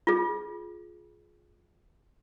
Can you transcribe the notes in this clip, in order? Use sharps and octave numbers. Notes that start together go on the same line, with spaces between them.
F4 G#4